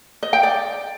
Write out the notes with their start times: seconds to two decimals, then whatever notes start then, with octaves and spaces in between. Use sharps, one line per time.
0.23 D#5
0.33 G5
0.43 D5